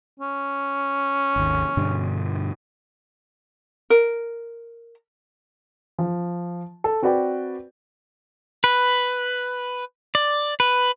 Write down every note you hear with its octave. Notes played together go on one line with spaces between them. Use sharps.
C#4
G#1 D#2
G2 B2 D3
A#4
F3
A4
C4 F#4 B4 D5 G5
B4
D5
B4